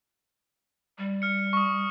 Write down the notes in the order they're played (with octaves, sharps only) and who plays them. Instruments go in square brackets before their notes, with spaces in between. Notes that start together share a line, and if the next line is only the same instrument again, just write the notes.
[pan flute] G3
[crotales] F6 C#7
C#6 D#6